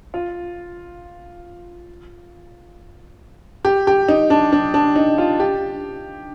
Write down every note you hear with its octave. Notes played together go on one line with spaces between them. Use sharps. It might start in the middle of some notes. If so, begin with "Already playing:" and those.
F4
G4
G4
D#4
D4
D4
D4
D#4
F4
G4